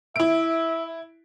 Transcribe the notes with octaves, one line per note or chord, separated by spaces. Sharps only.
E4 E5 D7